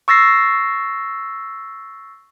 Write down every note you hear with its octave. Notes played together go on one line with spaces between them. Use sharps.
C#6 E6 A6 A#6 C7